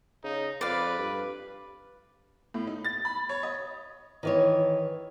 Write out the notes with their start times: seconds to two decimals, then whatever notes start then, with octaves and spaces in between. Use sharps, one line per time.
0.24 C#3 D#4
0.61 F2 B4 D5 F5
0.98 G2
2.54 A2
2.67 D#4
2.85 A6
3.05 B5
3.29 C#5
3.43 D#5
4.23 D#3 E3 C#5